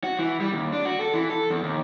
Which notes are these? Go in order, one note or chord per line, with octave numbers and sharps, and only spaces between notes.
F#4
E3
G3
D#2
D4
F#4
A4
E3
A4
E2
D#2